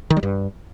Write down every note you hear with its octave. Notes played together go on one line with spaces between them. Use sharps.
D#3
G3
G2